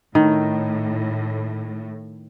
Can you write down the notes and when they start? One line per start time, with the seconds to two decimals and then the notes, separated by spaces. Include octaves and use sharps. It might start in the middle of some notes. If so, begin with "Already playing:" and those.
0.15 A2 D#3